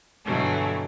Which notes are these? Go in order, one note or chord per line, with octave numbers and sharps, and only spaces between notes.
G2 B2 D3 E3 F#3 A3